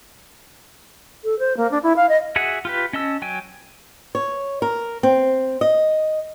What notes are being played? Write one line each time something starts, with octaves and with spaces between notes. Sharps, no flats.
A4
C5
A#3
D4
E4
F5
D#5
F#4 G#4 E5 F#5 G#5
F4 G4 B4
C#4 D#5 A5 E6
F#3 G5 G#5
C#5
A#4
C4
D#5